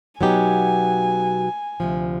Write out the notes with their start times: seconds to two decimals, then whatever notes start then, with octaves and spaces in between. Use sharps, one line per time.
0.20 B2 F#3 B3 D#4 G4 G#5
1.80 D2 C3 F3